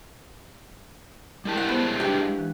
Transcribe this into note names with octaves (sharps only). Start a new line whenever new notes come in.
G3 G#3 E4 A#4 G5 A5
G4 F#5
B3 C5
F#3 D4 G4 B4 G5
E5 F5
E3 G#3 F#6